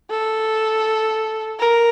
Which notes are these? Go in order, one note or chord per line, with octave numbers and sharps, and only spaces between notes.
A4
A#4